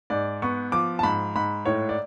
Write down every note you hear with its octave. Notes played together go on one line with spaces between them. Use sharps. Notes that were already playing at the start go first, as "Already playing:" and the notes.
G#2 D5
B3 C#6
F3 D6
A5
G#2 B5
G#2 B5
A2 C#5
D5